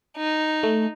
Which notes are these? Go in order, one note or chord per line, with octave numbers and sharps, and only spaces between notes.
D#4
A3